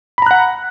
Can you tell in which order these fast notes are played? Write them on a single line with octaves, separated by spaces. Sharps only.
B5 A#5 F#6 F#5